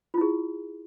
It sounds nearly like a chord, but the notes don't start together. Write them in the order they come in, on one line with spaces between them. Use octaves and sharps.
F4 E4 G#4